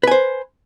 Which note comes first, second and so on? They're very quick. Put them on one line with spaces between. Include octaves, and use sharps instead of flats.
B4 G#5 C5